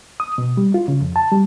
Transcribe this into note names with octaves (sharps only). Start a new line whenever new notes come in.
D#6
B2
G3
F4
C#3
F2
A5
G3